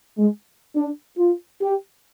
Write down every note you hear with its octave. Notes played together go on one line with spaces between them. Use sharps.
G#3
D4
F4
G4